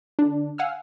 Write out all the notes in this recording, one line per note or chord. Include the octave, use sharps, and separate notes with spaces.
D3 D4
F5 F#5 G#5 E6 F6